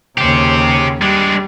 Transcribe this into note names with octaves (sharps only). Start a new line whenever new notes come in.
D#2 C#3 G4 C5
G3 G#3 D4